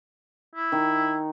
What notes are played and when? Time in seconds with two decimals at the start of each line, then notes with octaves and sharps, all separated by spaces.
0.55 E4
0.72 D#3